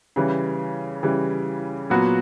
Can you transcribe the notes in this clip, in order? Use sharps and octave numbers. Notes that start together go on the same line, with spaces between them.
C#3 E3 G3
C#3 E3 G3
A#2 F#3 B3 F#4